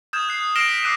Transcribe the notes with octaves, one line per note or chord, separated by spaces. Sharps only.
D#6 F6 G6 G#6 E7
F#6 C7
F6 A#6 C7 D7 E7 G7
F6 B6 G7
D6 E6 F#6 C7 D#7 E7